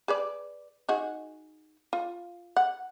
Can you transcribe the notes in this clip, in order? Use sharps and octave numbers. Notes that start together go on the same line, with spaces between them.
G#4 B4 D5
D#4 F#4 G#4
F4
F#5